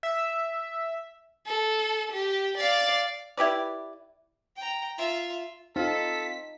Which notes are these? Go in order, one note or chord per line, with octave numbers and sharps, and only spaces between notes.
E5
A4
G4
D5 F5
E4 G4 B4 D5
G5 A#5
F4 E5
C4 D#4 F4 A4 B6